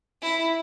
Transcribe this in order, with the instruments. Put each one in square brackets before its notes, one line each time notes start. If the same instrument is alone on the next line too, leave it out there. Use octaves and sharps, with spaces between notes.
[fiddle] E4